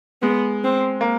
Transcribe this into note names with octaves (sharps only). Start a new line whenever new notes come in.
G#3 B3
C4
A#3